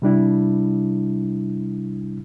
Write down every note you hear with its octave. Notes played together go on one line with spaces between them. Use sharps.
C3 G3 D4 E4